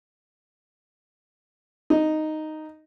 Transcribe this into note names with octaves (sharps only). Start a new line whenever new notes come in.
D#4